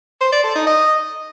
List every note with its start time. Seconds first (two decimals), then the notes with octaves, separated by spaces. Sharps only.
0.21 C5
0.32 D5
0.44 A4
0.55 D#4
0.67 D#5